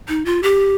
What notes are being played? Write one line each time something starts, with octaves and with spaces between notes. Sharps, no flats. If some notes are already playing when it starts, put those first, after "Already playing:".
D#4
F4
G4